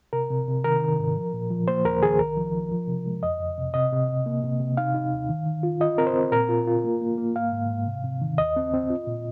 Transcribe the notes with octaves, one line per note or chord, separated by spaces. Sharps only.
C3 A#4
C3
C3
D#3 A#4
D#3
G#2
F3
A#2
F3
A#3 C5
D#2 A#4
D#3 G#4
C2 A#4
F3
F3
F3
C3
G#3
F2 D#5
F2
C3
C3 D#5
C3
C3
A#3
C3
C3
D#4 F5
D#4
D#2
D#3
D#3
F4
F4 D#5
C4 A#4
C5
C4
A#2 A#4
F4
F4
A#3
A#3
A#3
G#2 F5
G#2
G#2
C3
C3
D#3
D#2 D#5
C4
C4
F4
A#2